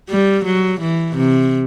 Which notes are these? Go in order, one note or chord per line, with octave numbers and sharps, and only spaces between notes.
G3
F#3
E3
C3